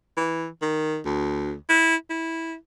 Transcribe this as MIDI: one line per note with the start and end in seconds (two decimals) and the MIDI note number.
0.17 0.48 52
0.62 1.00 51
1.05 1.54 38
1.69 1.96 64
2.10 2.55 64